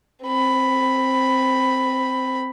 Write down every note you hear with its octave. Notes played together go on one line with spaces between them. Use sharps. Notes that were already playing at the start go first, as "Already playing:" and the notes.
C4 B5